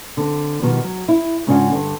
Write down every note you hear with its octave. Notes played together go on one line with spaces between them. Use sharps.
D3 C4
B2 D#3 F3 G3 B3
F#3
E4
G#2 C#3 C#4 D4 F4 F#5
G2 D3